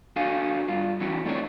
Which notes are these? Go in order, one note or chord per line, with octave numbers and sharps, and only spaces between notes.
D4 F#4 A4 F5 G#5
G2 F4
E3 C#4 F#4 G4
A3 C4 D4 D#4 A4 C#5